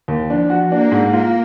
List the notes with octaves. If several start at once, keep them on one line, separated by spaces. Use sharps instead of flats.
D#2
F3 D4
F#4
A#3 D4
G#2
A#3 F4